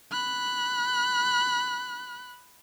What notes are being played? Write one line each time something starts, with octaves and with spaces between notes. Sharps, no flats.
B5 F#6